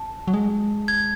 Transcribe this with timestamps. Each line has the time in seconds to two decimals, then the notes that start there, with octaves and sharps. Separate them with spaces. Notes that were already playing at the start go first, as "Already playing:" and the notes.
Already playing: A5
0.28 F#3
0.33 G#3
0.88 G#6